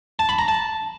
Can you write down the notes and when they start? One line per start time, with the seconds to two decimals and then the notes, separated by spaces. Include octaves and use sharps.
0.19 A5
0.29 B5
0.39 A#5
0.48 A5